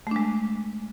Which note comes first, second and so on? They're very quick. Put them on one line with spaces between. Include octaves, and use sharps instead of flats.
A3 D4 G#3